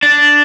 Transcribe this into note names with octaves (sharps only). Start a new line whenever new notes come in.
D4